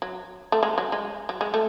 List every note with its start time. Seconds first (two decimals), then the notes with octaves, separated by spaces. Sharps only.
0.02 F#3
0.52 A3
0.63 G#3
0.78 F#3
0.92 G#3
1.29 F#3
1.41 G#3
1.54 A3